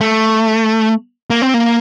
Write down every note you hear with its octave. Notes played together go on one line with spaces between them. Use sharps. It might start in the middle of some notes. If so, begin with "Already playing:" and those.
A3
A#3
C4
A#3